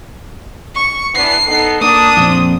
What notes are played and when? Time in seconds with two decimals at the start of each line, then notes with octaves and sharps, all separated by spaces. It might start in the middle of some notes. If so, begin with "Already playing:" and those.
0.75 C#6
1.15 E3 B3 D4 C7
1.47 B3 D#4 A4
1.81 A#3 D4 D#6
2.17 F2 A#2 C4